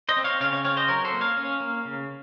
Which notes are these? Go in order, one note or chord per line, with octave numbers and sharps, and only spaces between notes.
C5 D#5
C4
C#5 F5
C#3 C#5 F5
C#5 F5
C4 C#5 F5
C5 D#5
F#3 A#4 C#5
A4 C5
A#3
C#5 F5
C#4
A#3
C#3